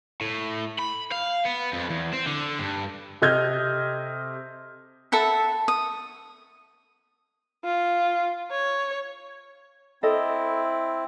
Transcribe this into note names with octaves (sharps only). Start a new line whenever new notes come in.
A2
B5
F5
B3
F2
E2
C4
D3
G2
C3 A4 D#5 F6 G6 G#6
A4 E5 F#5 B5
D#6
F4
C#5
C4 E4 A4 D#5